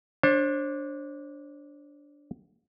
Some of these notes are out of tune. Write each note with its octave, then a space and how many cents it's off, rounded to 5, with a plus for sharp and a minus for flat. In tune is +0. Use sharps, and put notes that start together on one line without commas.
D4 -10 C5 +40